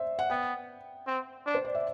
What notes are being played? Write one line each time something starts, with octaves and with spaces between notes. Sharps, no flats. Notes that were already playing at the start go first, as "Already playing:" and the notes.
Already playing: C5 D5 E5
F#5
B3 G5
C4
D4
C5
D5
E5